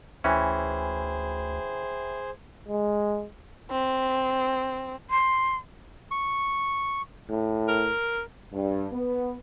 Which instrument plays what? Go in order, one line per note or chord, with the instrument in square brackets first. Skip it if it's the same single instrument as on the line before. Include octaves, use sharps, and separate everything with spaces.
[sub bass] D2 [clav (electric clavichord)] E3 C#4 [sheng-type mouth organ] G#4 C5 [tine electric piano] E5 G5 B5
[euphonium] G#3
[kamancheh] C4
[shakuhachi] C6
[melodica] C#6
[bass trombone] A2
[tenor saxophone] A#4
[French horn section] G2
B3